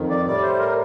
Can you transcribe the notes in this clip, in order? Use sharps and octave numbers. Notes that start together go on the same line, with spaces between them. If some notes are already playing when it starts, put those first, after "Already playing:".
Already playing: F2 D#3
D5
A2 G3 D5
C5
A#4